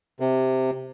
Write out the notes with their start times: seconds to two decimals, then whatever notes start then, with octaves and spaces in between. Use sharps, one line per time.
0.20 C3